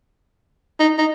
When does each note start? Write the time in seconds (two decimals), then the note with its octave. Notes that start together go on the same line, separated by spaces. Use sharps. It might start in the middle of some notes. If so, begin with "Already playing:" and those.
0.80 D#4
0.98 D#4